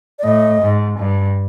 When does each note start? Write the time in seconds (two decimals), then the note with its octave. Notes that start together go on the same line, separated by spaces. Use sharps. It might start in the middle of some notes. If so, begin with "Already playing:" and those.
0.19 D5
0.23 A2 D#5
0.61 G#2
0.99 G2